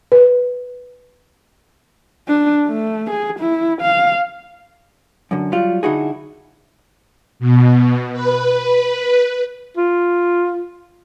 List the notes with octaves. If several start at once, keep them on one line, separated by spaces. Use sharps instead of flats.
B4
D4
A3
G#4
E4
F5
F#2 D3
F#3 G3 F4
D3 D#4 E4 F#4 G#4
B2
B4
F4